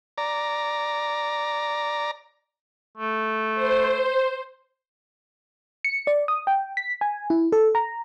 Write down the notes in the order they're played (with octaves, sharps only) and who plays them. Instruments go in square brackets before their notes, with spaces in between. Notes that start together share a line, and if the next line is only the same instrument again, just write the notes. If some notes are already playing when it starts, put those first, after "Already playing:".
[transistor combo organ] D5 A#5
[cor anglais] A3
[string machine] C5
[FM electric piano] C#7
D5
D#6
G5
B6
G#5
E4
A4
A#5